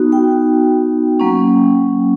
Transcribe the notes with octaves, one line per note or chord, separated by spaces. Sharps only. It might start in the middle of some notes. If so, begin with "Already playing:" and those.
Already playing: B3 D#4 F#4
G5
F#3 A#3 C#4